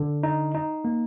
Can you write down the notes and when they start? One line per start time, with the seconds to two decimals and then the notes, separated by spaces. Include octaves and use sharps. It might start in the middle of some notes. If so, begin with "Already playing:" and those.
Already playing: D3
0.23 D#4
0.55 D#4
0.85 A#3